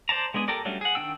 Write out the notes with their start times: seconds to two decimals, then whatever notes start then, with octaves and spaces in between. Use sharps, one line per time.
0.09 C5 D5 A5 A#5
0.34 G#3 B3 D4 G#4
0.48 G4 A4 A#4 D5
0.65 F#3 G3 A3 C#4 D4
0.81 G#4 F#5
0.95 D#3 D4 G5 E6